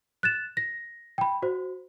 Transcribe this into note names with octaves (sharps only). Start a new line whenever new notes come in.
F#6 A6 E7
A#6
G5 B5
F#4 C5